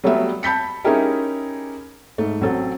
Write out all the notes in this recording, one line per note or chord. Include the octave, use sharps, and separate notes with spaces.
F#3 G3 A3 B3 E5
A5 B5 G6 B6 C#7
C#4 D#4 E4 G4 G#4 A#4
G#2 A3
A1 F#3 C4 A4